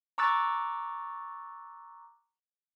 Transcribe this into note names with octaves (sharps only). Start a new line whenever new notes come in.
A#5 C#6 D6 E6 F#6 A6